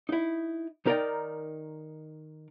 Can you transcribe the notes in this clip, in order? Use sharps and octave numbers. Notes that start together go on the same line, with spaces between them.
D#4 E4
D#3 D#4 A#4 C5 D5 G5